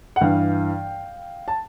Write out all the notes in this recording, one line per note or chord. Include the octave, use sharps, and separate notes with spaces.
F#5
G2 E3 F5 G5
A5